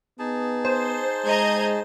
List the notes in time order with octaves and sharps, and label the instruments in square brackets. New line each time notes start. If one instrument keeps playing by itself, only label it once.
[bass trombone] B3 [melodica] D#4 G#4 A5
[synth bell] C5
[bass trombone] G#3 [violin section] D#5 A#5 G#6